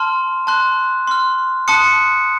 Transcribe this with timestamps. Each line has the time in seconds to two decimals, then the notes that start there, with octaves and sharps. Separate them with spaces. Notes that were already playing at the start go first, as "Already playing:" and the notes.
Already playing: A5 C6 F6
0.47 A5 C6 F#6
1.07 C6 F6
1.68 A5 C6 D#6 F#6 C#7